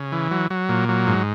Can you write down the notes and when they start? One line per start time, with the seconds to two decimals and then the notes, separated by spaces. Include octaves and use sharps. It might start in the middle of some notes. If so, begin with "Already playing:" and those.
Already playing: C#3
0.12 E3
0.31 F#3
0.50 F#3
0.69 A#2
0.89 F#3
1.07 G#2